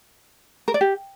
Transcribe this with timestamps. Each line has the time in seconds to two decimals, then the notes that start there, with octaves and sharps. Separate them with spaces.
0.68 A#4
0.74 D5
0.81 G4